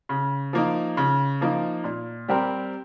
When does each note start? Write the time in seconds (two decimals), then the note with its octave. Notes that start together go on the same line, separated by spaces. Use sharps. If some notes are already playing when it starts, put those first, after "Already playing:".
0.09 C#3
0.53 F3 A#3 D#4
0.97 C#3
1.41 F3 A#3 D#4
1.84 A#2
2.28 G3 C4 G4 A#4